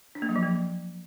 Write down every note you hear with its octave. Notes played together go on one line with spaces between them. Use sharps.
D4
A#3
F#3
F3
A#3